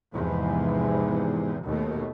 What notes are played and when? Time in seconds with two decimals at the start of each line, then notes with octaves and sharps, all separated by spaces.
0.14 E2 G#2 C3 E3 F3
1.65 D#2 B2 A3